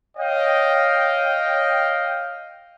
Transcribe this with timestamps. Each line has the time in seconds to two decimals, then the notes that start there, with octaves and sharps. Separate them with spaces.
0.18 C#5 D#5 F5 G5